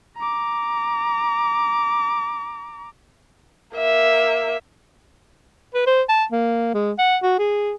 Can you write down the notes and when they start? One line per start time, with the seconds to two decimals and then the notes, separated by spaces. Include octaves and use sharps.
0.17 A#5 D6
3.77 A#3 E5
5.74 B4
5.87 C5
6.09 A5
6.32 A#3
6.75 G#3
6.99 F#5
7.23 F#4
7.39 G#4